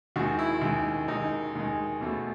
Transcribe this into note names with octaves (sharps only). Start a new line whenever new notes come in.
D#2 D#3 G#3 F#4
E4
D#2 D#3 G#3
D#2 D#3 G#3 D#4
D#2 D#3 G#3
E2 B2 A3